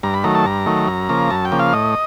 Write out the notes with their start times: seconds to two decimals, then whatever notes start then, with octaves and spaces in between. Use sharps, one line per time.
0.03 G2 A#5
0.14 B5
0.24 D#3 F#3 A3 A#5
0.35 A5
0.45 G2 A#5
0.66 D#3 F#3 A3
0.88 F#2
1.09 C#3 F3 A#3
1.31 F#2 A5
1.45 G5
1.52 C#3 F3 A#3
1.59 F5
1.73 A2 D#5